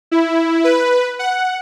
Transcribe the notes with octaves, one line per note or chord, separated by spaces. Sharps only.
E4
B4
F#5